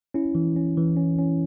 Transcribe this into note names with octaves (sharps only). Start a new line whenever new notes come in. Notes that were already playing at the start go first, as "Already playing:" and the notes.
C#4 E4
E3
C#4
E3
C#4
C#4